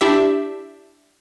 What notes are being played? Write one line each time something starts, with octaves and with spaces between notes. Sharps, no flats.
D4 E4 G4 E5